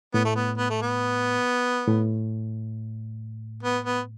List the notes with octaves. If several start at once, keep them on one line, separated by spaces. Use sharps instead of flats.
A2 B3
A3
B3
B3
A3
B3
A2
B3
B3